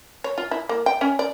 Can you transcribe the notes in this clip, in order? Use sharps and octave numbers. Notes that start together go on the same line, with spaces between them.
C#5
F4
E4
A#3
G5
C#4
D5